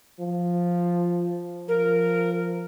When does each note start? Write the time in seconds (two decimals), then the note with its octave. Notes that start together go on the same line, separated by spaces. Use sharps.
0.19 F3
1.68 F3 A#4